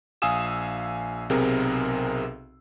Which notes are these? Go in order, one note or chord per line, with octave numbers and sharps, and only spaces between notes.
A#1 F5 G#5 D#6 E6 E7
B1 C3 C4 G#4 A#4